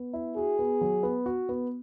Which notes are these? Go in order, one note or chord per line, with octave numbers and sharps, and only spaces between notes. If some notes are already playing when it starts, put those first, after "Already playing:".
Already playing: B3
E4
F#4 G#4
B3
F#3
B3
F#4
B3